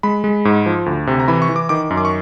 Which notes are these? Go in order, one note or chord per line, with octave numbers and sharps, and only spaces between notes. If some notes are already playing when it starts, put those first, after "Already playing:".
G#3 B5
G#3
G#2
F3
D2
C3
A#5
E3 B5
C#6
E3
D6
D#3 D6
F#2
D6
C#6